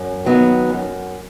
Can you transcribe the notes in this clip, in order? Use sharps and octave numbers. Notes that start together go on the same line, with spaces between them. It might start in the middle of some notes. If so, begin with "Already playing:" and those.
Already playing: F#2
D#3 F#3 B3 D#4
F#2